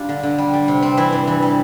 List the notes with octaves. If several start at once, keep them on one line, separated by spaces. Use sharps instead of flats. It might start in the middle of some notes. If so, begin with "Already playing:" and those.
Already playing: G3 D4 F4 G4
D3
D3
G3
G3
C3
C4
E3 E4
G2
E3
G3